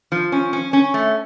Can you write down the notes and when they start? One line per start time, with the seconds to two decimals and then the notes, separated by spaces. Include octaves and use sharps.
0.12 F3
0.32 C#4
0.53 C#4
0.73 C#4
0.94 A3